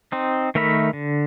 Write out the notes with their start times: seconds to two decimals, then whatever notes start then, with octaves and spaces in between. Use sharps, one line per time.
0.12 C4 D#4
0.55 D#3 A3 A#4 E5 B5
0.93 D3